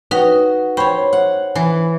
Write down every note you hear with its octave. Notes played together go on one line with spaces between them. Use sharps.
D#4 F#4 B4 D#5 G5
C5 C#5 G5 B5 C#6
F#5
E3